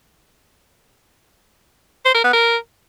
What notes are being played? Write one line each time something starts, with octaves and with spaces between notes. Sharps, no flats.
C5
A#4
B3
A#4